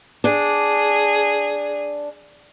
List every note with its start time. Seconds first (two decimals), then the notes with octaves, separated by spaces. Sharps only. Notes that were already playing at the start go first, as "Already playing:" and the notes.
0.24 D4 G#4